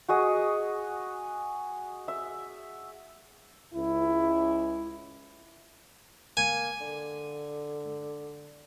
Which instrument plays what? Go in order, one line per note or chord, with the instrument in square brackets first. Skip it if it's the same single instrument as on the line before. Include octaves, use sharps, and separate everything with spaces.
[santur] F#4 G#4 D#5
E5
[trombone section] C#2 E4
[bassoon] A#3 [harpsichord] G#5
[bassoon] D3